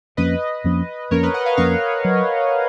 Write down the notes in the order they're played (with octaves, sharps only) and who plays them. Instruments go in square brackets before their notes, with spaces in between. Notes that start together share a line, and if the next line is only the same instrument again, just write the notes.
[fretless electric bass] F2 F3 A#3 C#4 [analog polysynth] B4 D#5
[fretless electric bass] F2 F3 A#3 C#4
[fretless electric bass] F2 F3 A#3 C#4 [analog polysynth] A#4 C#5
[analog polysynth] B4 D#5
D#5 F#5
C#5 F5
[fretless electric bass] F2 F3 A#3 C#4 [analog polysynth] C#5 F5
[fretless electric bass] F#3